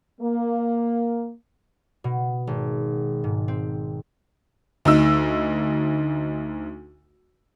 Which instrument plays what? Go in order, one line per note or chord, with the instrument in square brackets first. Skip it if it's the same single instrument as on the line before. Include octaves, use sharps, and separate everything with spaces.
[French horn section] A#3
[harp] B2
G#1
G#2
C4
[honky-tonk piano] D2 D#4 E6